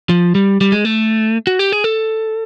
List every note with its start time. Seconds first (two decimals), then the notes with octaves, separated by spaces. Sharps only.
0.09 F3
0.35 G3
0.61 G3
0.72 G#3
0.85 A3
1.47 F#4
1.59 G4
1.72 G#4
1.84 A4